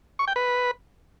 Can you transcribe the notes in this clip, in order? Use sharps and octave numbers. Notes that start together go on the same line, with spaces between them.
C#6
G5
B4